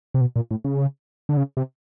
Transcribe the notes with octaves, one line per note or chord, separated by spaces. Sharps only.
C3
B2
A#2
A2
C#3
D3
C#3
C3